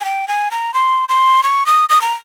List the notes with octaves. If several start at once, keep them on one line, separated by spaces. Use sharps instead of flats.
G#5
G5
G#5
A#5
C6
C6
C#6
D#6
D#6
A#5